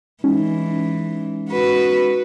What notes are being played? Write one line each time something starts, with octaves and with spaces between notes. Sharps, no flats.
E3 G#3 C#4 D#4
F#4 B4